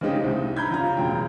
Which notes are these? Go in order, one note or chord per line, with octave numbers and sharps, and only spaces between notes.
C#3 G#3 C4 C#4 D#4 G4
C2
A#5 B5 G6 G#6
C#3 F4 A#5
E1 F#2 G5